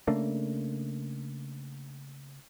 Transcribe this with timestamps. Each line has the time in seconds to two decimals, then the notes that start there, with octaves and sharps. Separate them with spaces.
0.07 C#3 A3 A#3 D4